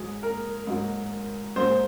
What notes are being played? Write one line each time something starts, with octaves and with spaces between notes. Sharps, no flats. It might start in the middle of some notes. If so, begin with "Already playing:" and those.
Already playing: G#2 F#3 G#4
A#4
G#2 F#3
G#2 F#3 C5